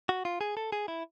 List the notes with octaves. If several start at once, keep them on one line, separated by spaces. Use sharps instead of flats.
F#4
F4
G#4
A4
G#4
E4